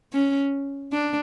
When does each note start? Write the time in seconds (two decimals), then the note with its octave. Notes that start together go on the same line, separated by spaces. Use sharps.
0.13 C#4
0.92 D4